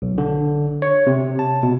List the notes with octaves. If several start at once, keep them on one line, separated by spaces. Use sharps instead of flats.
B1
D3
C#5
C3
A5
B2